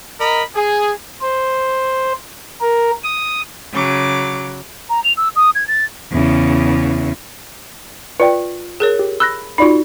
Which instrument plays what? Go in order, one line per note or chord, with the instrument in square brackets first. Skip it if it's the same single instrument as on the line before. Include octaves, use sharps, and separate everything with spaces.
[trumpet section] A#4 D#5 A#5 B5
G#4
[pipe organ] C5
A#4
D#6
[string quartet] C#3 F#3 D6
[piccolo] A#5
F7
E6
D#6
G#6
A6
[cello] E2 C#3
[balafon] F4 [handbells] B4 D5 G5
[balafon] G#4 A#4 C#5
[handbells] G4
[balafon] B5 [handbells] E6 F#6 A#6
[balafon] D#4 F#4 [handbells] F4 D5 B5